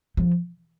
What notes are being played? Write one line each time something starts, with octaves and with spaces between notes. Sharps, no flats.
F3